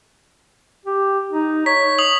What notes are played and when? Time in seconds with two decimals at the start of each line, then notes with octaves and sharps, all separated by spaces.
0.85 G4
1.32 D#4
1.66 C#5 B6
1.98 D#6 F#7